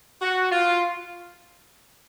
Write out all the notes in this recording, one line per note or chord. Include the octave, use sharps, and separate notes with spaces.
F#4
F4